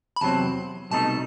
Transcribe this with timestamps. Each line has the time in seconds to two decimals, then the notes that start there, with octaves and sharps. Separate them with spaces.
0.16 B5
0.21 E2 C3 F#3 C4 A5
0.91 C2 B2 A3 D#4 A4 A5